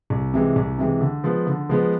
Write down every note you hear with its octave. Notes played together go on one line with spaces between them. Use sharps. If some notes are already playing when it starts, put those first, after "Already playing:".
C2
C3 E3 G#3
C2
C3 E3 G#3
D3
F3 G#3 B3
D3
F3 G#3 B3